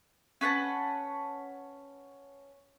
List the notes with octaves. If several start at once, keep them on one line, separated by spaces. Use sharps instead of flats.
C#4 B4 F#5 A5